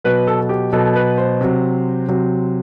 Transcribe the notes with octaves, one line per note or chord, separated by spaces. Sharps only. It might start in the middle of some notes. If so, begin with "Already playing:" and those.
B2 F#3 B4
A4
A4
G4
B2 F#3 A4
B4
C5
C3 F#3
C3 F#3